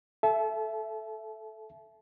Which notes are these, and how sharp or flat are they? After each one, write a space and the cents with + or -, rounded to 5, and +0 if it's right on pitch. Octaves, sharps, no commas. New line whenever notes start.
A4 -10 E5 +15 A5 -35